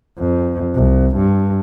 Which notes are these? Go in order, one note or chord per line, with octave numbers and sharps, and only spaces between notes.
F2
C2
G2